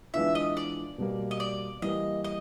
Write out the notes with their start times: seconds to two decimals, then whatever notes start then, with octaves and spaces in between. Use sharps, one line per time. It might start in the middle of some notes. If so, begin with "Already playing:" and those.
0.14 E3 G#3 B3 D4 F4 E5
0.35 D#5
0.57 D5
0.98 B2 G3 A#3
1.31 D#5
1.40 D5
1.82 E3 G3 A#3 D#5
2.24 D#5